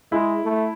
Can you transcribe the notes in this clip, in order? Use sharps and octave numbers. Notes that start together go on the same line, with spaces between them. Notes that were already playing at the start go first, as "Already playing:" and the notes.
G#3 E4
A3